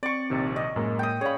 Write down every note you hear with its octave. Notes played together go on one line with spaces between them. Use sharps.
C4 D5 C#6
A#1 C3 D#3
D#5
F#2 A2 G#3 A#3 A#4
G5 D#6
C#4 G#4 C#5 D5 F5 B5